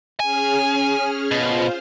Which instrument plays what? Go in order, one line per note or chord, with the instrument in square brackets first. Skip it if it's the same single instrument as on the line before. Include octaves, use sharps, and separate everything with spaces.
[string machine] C#4 G#4 F6 [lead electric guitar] G#5
[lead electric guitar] B2 [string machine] F4 C5